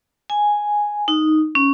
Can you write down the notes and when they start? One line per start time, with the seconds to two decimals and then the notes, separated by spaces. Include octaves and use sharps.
0.30 G#5
1.08 D#4
1.55 C#4